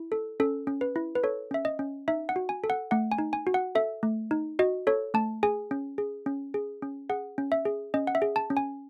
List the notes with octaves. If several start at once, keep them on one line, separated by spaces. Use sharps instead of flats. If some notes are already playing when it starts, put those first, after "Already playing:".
Already playing: E4
A4
C#4 A4
C#4
B4
E4
B4
A4 C#5
C#4 E5
D#5
C#4
D#4 E5
F#5
F#4
G#5
A4
F#5
A3 F#5
G#5
D#4
G#5
F#4
F#5
A4 E5
A3
D#4
F#4 D#5
A4 C#5
A3 A5
G#4 G#5
C#4
G#4
C#4
G#4
C#4
G#4 F#5
C#4
E5
G#4
C#4 D#5
F#5
E5
G#4
A5
C#4
G#5